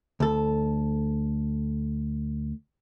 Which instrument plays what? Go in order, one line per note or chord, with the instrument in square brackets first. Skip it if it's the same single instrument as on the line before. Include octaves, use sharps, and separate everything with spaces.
[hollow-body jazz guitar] D2 A4